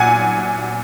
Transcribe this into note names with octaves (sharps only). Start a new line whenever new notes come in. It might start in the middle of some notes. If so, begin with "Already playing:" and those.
Already playing: A#2 F#3 F#5 G#5